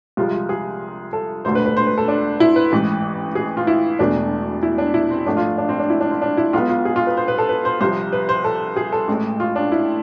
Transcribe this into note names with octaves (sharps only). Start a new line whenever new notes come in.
C2 C3 F3 G#3 F4
F4
G#4
A4
E1 D2 D3 A3 C5
B4
B4
C5
B4
A4
D4
E4
B4
A1 G#2 E3
G#4
F4
E4
E1 E2 B2 A3 D4
E4
D4
E4
C4
G#1 G#2 F3 A3 D4
F4
D4
C4
D4
E4
D4
C4
D4
E4
B1 B2 G#3 B3 F4
F4
G#4
F4
B4
C5
B4
A4
B4
C5
C2 C3 F3 C5
B4
C5
A4
G#4
A4
A1 A2 G#3
F4
D4
E4